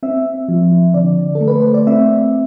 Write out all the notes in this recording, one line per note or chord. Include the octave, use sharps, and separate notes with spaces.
C4 E5
F3
D3 D5
A4
A3
B4
C5
D5
C4 E5